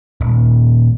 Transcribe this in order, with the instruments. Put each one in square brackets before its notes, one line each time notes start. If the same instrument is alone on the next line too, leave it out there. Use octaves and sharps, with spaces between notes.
[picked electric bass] D#1